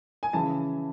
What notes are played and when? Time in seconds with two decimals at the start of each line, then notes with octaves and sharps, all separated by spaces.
0.23 G#5
0.33 C#3 E3 A5